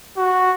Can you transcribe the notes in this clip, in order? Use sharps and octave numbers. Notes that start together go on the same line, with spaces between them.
F#4